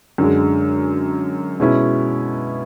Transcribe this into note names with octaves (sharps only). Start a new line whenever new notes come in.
F#2 D3 G#3
B2 G#3 C#4 E4